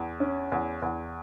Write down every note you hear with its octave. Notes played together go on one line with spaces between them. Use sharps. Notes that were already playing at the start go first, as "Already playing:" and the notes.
Already playing: E2
C#4
E2
E2